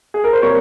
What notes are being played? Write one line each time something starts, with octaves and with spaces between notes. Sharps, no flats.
G#4
A#4
C5
C3 G3 A#3 A#4 C#5